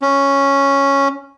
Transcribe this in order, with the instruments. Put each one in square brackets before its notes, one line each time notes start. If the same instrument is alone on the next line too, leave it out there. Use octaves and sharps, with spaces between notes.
[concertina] C#4